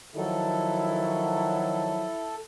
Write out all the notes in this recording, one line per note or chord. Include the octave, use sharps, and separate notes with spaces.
D#3 F3 F#3 E4 A4